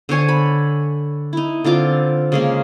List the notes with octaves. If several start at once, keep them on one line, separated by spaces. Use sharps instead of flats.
D3 C5 C#5 G#5
B5
D#4 E4
D3 C4 F4 D6
C#3 G#3 A#3